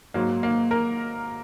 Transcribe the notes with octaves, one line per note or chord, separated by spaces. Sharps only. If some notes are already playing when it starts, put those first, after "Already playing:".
G#2 F#3 A#3
A#3
A#4